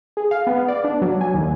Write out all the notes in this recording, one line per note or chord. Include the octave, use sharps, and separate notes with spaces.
G#4
F5
B3
D5
D4
F#3
G#5
D#2